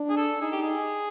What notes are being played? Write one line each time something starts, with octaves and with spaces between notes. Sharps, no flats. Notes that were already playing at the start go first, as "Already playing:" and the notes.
Already playing: D4
G#4
A4
D#4 G#4
G4
G#4